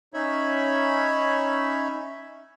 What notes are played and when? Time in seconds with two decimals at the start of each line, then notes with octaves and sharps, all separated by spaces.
0.14 C#4 D#4 C#5 E5 B5